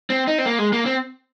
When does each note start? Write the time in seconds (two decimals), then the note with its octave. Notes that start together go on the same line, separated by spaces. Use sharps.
0.10 C4
0.27 D#4
0.38 C4
0.46 A#3
0.58 G#3
0.73 A#3
0.86 C4